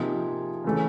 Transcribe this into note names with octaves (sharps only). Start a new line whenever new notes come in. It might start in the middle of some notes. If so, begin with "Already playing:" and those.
Already playing: C3 F3 A#3 D#4 G#4
C#3 E3 A3 C#4